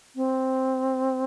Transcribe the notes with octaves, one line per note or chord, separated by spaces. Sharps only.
C4